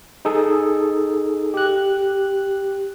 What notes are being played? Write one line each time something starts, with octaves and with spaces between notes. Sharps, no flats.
D#4 G#4 A4
G4 F#6